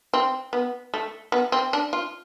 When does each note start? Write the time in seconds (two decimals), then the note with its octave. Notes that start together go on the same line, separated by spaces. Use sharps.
0.14 C4
0.53 B3
0.94 A3
1.32 B3
1.52 C4
1.73 D4
1.93 F4